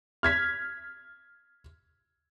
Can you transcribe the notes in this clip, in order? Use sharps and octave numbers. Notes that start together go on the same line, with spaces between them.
F6 G#6 B6